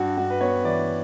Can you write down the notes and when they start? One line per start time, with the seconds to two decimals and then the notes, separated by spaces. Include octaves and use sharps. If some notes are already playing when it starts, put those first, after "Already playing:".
Already playing: G2 F#4
0.17 G2 F#4
0.30 B4
0.41 B3 C#5
0.64 E3 D5